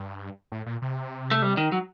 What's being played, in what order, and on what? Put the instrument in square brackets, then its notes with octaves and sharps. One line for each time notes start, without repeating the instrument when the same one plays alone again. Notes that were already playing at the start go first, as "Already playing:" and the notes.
Already playing: [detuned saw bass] G2
A2
A#2
C3
[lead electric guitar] A3
G3
D#3
F#3